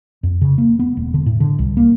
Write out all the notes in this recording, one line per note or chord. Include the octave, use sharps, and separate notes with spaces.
F2
C#3
A#3
B3
E1
D3
A2
D3
C2
A#3